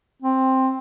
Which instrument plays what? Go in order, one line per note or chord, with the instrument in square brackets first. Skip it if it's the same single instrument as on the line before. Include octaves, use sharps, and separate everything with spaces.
[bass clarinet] C4